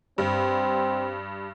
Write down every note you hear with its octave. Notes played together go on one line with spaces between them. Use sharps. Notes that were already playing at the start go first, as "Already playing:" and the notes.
G2 C4